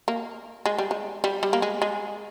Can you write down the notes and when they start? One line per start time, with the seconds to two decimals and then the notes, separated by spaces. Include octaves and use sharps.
0.08 A#3
0.66 G#3
0.78 G3
0.91 G#3
1.24 G3
1.43 G3
1.53 A#3
1.62 G#3
1.82 G#3